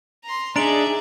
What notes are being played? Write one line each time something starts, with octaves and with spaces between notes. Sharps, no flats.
A#5 C6
D4 D#4 G#4 D5 E5 A#5 D7 F#7